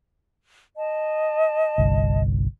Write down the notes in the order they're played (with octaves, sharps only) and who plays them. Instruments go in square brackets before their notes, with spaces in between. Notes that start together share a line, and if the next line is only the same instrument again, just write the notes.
[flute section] D#5 A5
[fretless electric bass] G1 C2